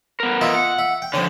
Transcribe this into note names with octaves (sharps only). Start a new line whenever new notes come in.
B3 A#4
F4 D#5 E5
F#5
E5
G5
D3 F3 C#4 C#5